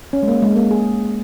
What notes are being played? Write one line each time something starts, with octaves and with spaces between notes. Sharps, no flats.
C#4
G#3
A#3
G#3
A#3
G#4